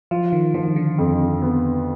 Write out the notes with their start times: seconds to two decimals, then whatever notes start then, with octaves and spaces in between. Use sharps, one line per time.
0.11 F3 F4
0.33 D#3
0.54 D#3 F3
0.76 D3
0.98 F2
1.42 B3